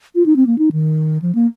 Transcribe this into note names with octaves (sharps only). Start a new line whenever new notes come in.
F4
D#4
C4
A#3
D#4
D#3
F3
A#3